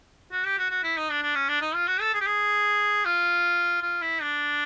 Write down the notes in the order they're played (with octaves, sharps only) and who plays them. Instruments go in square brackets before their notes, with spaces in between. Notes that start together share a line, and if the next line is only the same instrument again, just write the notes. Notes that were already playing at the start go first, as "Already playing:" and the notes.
[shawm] F#4
G4
F#4
F#4
E4
D#4
D4
D4
C#4
D4
D#4
F4
F#4
A4
G#4
G4
G#4
F4
F4
E4
D4